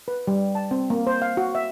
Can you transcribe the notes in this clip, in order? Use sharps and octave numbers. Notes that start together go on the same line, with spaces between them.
B4
G3
A5
C4
A#3
C5
F5
F#4
E5